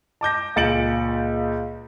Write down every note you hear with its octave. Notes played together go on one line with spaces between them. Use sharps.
A5 D6 G6 A#6
C#2 A#2 A6 C#7 D7 F#7